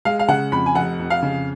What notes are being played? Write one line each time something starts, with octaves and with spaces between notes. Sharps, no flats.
G#3 F5
F5
C#3 F#5
F2 B5
G#5
F1 F#5
F2
F5
C#3